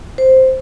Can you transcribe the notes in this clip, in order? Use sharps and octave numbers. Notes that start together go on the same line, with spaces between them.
C5